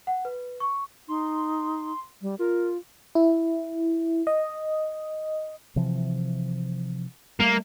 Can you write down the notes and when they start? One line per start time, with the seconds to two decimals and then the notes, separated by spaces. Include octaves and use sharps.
0.07 F#5
0.25 B4
0.60 C#6
1.08 D#4 C6
2.22 G3
2.39 F4 A#4
3.15 E4
4.27 D#5
5.76 C3 E3 F3
7.40 G3 A3 A#3